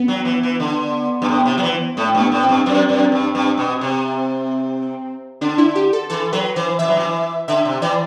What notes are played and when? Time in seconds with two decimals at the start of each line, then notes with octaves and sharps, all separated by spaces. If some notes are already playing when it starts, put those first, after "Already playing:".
Already playing: B3
0.08 F#3
0.25 E3
0.43 E3
0.60 D3
1.22 G2
1.29 A2
1.46 C3
1.58 F#3
1.63 E3
1.97 A2 A3
2.15 G2
2.20 B3
2.32 A2
2.43 C4
2.49 G2
2.66 F#2 C4
2.89 F#2
3.12 G2
3.35 G2
3.57 B2
3.81 C3
5.41 D3 D4
5.58 E4
5.75 G4
5.93 A4
6.10 E3 A4
6.33 F#3 B4
6.56 E3 C5
6.79 E3 E5
6.88 F#3
6.97 E3
7.48 D3 E5
7.65 C3
7.82 E3 D5